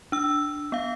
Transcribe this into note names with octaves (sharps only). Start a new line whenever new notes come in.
D4 E6
B3 F5